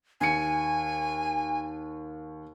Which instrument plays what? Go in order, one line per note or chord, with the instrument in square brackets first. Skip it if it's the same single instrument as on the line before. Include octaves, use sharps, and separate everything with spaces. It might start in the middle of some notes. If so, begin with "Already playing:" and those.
[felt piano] D#2 C#7 [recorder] G#5